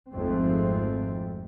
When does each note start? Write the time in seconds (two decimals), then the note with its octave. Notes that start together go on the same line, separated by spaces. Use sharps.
0.11 G#1 F2 G#2 A3 C4